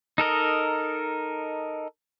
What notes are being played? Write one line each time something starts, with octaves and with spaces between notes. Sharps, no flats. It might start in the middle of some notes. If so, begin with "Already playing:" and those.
D#4 A4 A#4 D#5